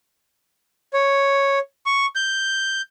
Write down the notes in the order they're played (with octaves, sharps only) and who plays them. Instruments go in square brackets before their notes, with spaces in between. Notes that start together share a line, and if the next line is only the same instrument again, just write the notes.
[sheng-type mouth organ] C#5
C#6
G6